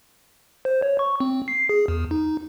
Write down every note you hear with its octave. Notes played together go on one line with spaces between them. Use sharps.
C5
C#5
C#6
C4
C7
G#4
E2
D#4